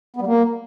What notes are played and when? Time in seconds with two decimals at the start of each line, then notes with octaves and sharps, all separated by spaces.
0.16 B3
0.21 G3
0.27 A#3